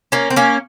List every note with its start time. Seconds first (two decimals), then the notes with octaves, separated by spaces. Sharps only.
0.12 A#3 C#4
0.30 C4
0.36 A#3 C#4